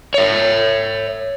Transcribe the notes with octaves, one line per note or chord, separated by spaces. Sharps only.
C#5 E5